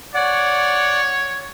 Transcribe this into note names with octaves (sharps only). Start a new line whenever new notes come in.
C#5 D5 F#5